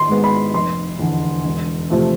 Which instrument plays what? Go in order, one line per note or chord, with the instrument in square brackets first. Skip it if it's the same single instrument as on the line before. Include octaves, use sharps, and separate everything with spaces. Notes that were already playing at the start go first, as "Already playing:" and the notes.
Already playing: [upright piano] G#1 C6
G#2 G#3 B3
B5
F1 C6
E2 D3
E1
C3 F3 A3